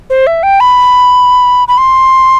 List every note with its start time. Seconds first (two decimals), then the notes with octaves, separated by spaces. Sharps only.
0.10 C5
0.27 E5
0.43 G5
0.60 B5
1.68 B5
1.78 C6